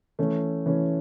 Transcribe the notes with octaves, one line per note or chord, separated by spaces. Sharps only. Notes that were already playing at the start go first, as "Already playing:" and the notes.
E3 A3 C#4
E3 A3 C#4